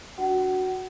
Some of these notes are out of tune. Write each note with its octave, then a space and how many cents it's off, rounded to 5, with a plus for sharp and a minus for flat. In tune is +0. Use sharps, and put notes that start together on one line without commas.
D4 -15 F#4 +0 F#5 +30